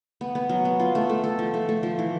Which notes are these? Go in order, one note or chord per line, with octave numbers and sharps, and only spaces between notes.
B3
B3
F#3
B3
F4
A3
A3
A4
F3
A3
A3
F3
E3